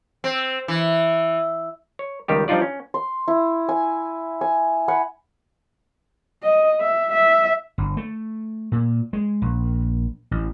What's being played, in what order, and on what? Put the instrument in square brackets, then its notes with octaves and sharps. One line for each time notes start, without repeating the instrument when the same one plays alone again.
[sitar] C4
E3
[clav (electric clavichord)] C#5
C#2 D#3 G3 G4
F3 G3 D4 D#4 F4 D5
C#4
[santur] C6
E4
G#5
G#5
F#5 G#5 B5
[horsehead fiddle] D#5
E5
E5
[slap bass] G1
A3
A#2
G#3
A#1
A1